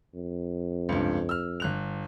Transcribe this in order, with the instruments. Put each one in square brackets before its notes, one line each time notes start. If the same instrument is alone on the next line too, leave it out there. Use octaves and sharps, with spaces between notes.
[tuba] F2
[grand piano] C#2 G2
E6 F6
G1 F#6 F7